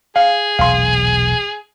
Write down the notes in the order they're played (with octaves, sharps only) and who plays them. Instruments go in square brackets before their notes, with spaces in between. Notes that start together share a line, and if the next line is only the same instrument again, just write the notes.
[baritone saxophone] G#4 [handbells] F5
[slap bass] E1 B1 A#2 [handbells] F5 C6